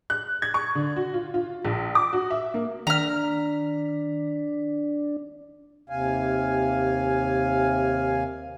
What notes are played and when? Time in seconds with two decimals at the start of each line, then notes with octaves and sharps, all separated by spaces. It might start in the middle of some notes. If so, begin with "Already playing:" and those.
0.10 F#6
0.42 G#6
0.54 C#6
0.75 D3
0.96 F#4
1.14 F4
1.34 F4
1.65 A#1
1.95 D6
2.13 F#4
2.31 E5
2.54 A#3
2.87 D#3 D4 A#5 F6 B6
5.90 D#2 C3 F5 G#5